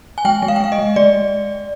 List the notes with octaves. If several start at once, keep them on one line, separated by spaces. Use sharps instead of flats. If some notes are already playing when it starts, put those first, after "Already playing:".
G#5
G#3 G5
G#3
F5
G5
G#3 F5
D#5
G#3
G#3 D5